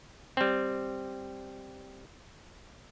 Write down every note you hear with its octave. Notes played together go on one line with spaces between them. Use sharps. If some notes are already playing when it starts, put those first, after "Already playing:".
G3 C4